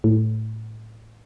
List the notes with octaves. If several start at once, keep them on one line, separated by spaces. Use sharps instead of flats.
A2